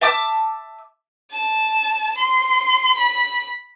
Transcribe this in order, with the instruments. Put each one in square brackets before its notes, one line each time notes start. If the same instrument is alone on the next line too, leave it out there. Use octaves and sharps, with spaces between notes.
[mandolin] E5 A5 D6 E6
[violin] A5
C6
B5